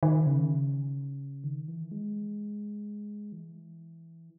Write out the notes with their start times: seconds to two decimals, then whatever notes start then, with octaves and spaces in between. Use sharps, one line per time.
0.03 D#3
0.26 C#3
1.44 D#3
1.68 E3
1.91 G#3
3.32 E3